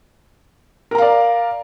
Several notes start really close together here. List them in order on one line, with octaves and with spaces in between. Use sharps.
A#4 A#5 F5 D5